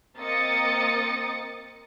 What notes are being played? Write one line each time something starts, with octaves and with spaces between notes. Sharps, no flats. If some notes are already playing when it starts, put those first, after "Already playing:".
A#3 C4 D#5 D#6 A6 C#7